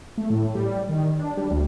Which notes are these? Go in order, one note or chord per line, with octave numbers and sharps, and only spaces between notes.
A3
A2
G3
D#3
D4
G3
D2